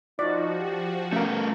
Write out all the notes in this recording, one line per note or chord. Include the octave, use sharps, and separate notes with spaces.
F3 D#4 F#4 D5
G4
B2 A3 C#4 A#4 F5